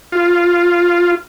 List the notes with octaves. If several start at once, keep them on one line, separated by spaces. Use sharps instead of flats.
F4